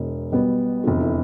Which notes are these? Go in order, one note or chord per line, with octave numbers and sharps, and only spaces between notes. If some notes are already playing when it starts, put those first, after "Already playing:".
Already playing: E1 E2 B2
B1 B2 G3 B3
F1 E2 D3 A3 F4
E4